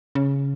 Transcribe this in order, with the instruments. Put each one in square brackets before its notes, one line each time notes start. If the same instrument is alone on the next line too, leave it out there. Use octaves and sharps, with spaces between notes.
[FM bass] C#3